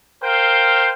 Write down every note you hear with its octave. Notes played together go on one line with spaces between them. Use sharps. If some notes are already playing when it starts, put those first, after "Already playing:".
A#4 C5 F5 G5